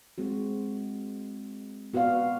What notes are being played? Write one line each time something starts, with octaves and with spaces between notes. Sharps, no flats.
G#3 C4 F#4
B3 F#4 B4 D5 F5